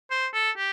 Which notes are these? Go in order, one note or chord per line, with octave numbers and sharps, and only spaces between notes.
C5
A4
G4